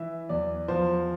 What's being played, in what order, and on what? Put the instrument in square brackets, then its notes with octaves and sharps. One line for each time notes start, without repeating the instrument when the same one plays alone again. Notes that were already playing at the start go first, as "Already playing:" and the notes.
Already playing: [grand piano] E3 E5
E2 D5
F3 C5